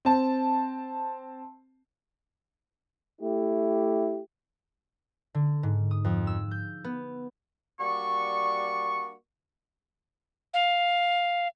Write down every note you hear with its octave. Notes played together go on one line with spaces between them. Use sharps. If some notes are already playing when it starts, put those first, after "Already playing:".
C4 A5
A3 E4 G4
D3
G#2
D#6
F2
E6
G6
B3
G3 A#3 D4 F#4 D5 C#6
F5